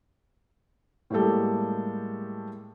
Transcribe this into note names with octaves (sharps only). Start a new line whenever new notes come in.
A2 G3 G#3 A#3 G4 A4